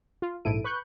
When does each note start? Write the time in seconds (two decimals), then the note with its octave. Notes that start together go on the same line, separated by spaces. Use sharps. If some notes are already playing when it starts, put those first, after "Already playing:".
0.22 F4
0.45 A#1 G#2 E4 A4 D7 D#7
0.64 B4 C#6 F#6 G6